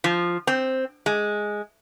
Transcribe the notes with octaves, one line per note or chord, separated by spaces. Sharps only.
F3
C4
G#3